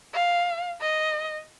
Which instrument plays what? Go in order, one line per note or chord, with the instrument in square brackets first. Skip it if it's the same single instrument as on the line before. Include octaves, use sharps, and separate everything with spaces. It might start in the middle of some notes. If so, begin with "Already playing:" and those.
[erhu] F5
D#5